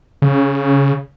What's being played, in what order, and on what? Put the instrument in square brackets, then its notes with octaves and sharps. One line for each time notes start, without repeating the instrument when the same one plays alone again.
[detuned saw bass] C#3